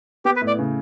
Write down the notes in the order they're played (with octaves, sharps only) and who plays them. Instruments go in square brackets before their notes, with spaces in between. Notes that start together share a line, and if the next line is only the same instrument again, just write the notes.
[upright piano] B3 [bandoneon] G4
[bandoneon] B4
[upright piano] A2
[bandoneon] D5
[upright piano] C#3